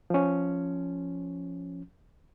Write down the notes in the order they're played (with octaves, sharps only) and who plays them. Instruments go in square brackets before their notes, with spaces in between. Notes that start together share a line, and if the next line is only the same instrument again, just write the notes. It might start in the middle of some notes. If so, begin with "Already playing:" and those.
[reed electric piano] F3 C#4